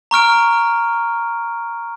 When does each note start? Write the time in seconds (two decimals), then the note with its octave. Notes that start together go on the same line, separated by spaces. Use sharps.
0.11 A#5 C#6 F6 D7